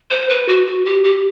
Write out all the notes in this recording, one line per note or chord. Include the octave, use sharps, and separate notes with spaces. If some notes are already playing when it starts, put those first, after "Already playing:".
C5
B4
F#4
F#4
G4
G4